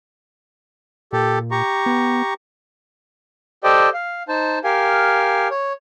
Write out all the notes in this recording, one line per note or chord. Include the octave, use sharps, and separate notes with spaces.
A#2 G4 A4
G4 A#5 C#6
B3
G4 A4 C5 D5 D#5 G5
F5
D#4 C5 A5
G4 A#4 F5 G#5
C#5